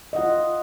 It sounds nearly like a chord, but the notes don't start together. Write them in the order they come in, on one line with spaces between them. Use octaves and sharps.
D#5 F#5 F4